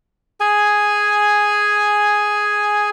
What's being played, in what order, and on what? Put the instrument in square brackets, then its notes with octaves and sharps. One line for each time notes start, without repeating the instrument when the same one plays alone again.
[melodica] G#4 G#5